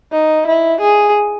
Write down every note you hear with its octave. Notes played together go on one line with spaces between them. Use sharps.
D#4
E4
G#4